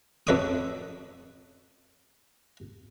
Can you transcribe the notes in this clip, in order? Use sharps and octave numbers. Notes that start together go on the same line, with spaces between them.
F2 A4 B4 C#5 D6 D#6